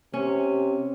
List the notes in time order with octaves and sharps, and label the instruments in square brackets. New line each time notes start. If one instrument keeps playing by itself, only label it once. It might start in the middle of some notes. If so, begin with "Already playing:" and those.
[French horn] C3 [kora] C#4